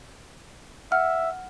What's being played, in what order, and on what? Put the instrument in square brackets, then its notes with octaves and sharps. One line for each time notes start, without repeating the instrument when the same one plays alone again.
[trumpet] E5 [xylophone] F#5 F6